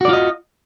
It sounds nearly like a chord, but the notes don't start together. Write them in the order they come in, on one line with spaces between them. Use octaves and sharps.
F#4 D5 F4 D#5